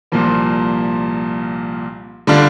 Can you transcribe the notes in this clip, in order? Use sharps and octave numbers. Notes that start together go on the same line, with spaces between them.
C2 A#2 F3 A#3
D3 G3 D4 F4